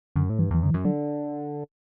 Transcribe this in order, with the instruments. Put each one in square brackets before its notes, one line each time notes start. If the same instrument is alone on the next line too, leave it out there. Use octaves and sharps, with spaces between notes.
[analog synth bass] F#2 [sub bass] D3
[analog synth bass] A2
[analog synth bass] G2 [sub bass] E3
[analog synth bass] E2 [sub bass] E3
[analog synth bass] F#2 [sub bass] D3
[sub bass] E3
[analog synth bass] F#2
[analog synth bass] D3 [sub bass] F#3